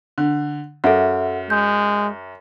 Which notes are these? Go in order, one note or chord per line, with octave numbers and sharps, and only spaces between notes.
D3
F#2 A4 E5 F#5
G#3 G6